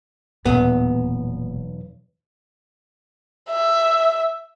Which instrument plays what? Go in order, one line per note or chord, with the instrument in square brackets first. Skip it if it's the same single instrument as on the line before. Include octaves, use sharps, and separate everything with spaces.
[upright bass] D#1 A#2 [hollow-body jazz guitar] B1 E2 B3
[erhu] E5